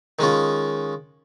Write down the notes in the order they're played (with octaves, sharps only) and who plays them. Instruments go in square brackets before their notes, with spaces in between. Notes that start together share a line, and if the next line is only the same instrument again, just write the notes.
[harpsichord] D#3 G#3 C#4 F4